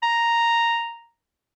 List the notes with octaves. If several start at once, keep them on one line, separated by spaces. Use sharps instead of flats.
A#5